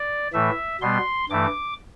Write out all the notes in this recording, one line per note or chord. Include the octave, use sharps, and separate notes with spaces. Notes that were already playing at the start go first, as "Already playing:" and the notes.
Already playing: D5
A2 E3 A3 E5
B2 G3 B3 C6
G2 E3 A3 D6